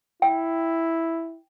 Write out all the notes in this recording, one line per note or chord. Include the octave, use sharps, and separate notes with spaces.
E4 G5